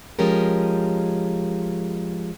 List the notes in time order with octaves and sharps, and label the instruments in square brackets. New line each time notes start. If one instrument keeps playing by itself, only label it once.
[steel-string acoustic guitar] F3 G#3 C#4 G4 A#4